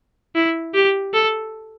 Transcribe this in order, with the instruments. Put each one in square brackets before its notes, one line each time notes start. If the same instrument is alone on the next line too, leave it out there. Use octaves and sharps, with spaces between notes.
[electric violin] E4
G4
A4